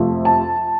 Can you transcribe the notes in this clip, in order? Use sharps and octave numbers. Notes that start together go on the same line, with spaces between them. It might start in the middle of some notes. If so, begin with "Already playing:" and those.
Already playing: F2 C3 F3 A3
A5